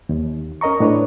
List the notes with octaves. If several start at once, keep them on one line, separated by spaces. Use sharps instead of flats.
D#2
C#4 A#4 D#5 A#5 C#6
A2 D4 B4 C#5